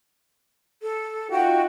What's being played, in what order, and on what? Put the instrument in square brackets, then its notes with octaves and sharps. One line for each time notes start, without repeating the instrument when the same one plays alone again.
[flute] A4
[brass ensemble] D#4 F4 F#4 [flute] G5